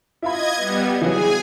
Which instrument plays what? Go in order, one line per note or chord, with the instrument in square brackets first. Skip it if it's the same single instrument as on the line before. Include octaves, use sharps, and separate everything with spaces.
[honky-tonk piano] E4 F4 B5 [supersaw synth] D#5 G#6
[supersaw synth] G3 B3
[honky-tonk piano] E3 F#3 F#4 [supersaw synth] G#4 G#5